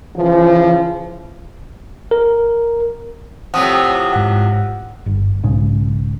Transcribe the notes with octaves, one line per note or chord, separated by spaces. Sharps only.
C#3 E3 F3
A#4
A2 C3 F3 F#5 D#6
G#2 F#5
G1
B1 G#2 C#3